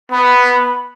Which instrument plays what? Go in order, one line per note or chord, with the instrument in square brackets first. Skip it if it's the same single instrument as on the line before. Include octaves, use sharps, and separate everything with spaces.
[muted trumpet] B3 [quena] B5